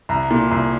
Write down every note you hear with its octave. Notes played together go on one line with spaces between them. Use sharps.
C2 A#5
A#2
C2